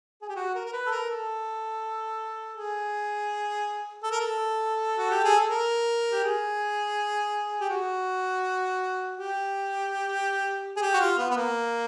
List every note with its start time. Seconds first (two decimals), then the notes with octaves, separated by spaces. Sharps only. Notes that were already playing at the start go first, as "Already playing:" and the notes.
0.22 G#4
0.29 G4
0.36 F#4
0.55 A#4
0.66 A#4
0.73 B4
0.86 A4
0.91 A#4
1.10 A4
2.57 G#4
4.04 A4
4.11 A#4
4.21 A4
4.98 F#4
5.10 G4
5.24 G#4
5.37 A4
5.50 A#4
6.12 G4
6.23 G#4
7.61 G4
7.70 F#4
9.17 G4
10.76 G#4
10.82 G4
10.94 F#4
11.00 F4
11.18 B3
11.31 B3
11.37 A#3